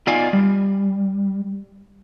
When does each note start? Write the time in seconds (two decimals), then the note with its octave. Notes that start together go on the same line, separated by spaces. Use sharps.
0.07 B3 D#4 F4 D5 F5 G#5
0.33 G3